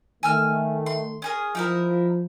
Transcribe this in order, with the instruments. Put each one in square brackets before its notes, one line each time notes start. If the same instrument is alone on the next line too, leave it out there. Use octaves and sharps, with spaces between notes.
[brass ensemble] D#3 A3 [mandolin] G#5 E6 F6
[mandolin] C6
C#4 G#4 A#4
[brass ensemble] F3 [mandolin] D#4 E4 A#4